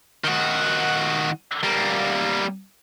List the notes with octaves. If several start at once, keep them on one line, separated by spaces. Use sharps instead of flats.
D#3 F#4
G3 A#3